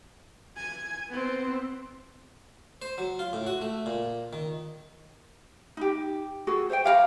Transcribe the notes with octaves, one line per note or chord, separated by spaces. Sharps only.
G#5
B3 C4
C5
F#3
F4
A2
F#4
A3
A#2
D#3
D#4 G4
F#4 G#4 A4
C5 C#5 E5 G5
G4 F5 F#5 A#5